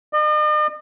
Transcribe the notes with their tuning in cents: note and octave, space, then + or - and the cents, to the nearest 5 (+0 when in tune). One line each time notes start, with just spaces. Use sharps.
D#5 -45